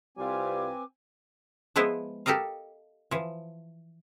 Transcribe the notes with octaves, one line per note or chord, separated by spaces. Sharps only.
C2 G3 C4 F4 B4 G#5 D6
F3 G#3 B3 E4 B4 C5
G4 A4 A#4 D#5 F5
E3 F3